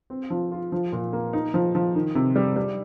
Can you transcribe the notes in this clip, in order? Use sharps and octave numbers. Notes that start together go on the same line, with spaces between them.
C4
F3
F4
F3
A#2
A#3
D#4
F3
F3
D#3
C3
G3
G3